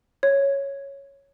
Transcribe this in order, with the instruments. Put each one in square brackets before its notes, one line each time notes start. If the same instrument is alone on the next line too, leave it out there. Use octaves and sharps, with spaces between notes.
[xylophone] C#5